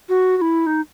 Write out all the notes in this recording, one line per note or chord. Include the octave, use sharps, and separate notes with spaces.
F#4
F#4
E4
D#4